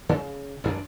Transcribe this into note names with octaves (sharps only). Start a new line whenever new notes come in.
C#3
A1 F#2 C#4 D4